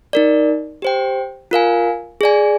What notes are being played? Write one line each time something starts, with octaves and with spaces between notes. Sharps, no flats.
D#4 A#4 D5
G4 C5 G5
F4 A#4 F5 G#5
G#4 D5 G#5